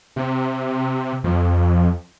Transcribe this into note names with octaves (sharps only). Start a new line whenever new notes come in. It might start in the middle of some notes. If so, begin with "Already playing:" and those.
C3
F2